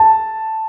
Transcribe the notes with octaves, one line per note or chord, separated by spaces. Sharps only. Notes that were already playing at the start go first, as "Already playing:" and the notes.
Already playing: A5